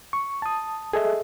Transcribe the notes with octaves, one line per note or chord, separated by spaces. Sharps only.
C#6
A5 D#6
G#4 A4 D#5 E5